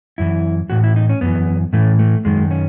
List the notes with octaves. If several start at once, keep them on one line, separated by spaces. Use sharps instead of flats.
F#2 E3 E4
A2 E3 F#4
E4
D#4
C#4
F#2 E3 B3
A2 E3 A3
A3
F#2 D#3 G#3
C#4